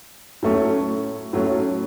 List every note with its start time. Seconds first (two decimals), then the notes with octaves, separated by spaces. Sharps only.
0.43 A2 F#3 A3 C#4
1.33 A2 F#3 A3 C#4